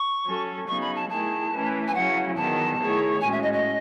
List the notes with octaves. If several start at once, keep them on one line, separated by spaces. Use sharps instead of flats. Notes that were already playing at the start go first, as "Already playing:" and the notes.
Already playing: C#6
F#3 C#4 F#4 A4
C#3 F#3 B3 D#4 C#6
B5
A5
D#3 A3 E4 G#4 A5
E3 A3 C#4 E4 B4
G#5
C#3 F#3 C#4 E4 F#5
E2 D#3 F#3 A5
D#3 A3 E4 G#4 C#5
A2 G#3 C#4 F#4 G#5
E5
D#5
D#5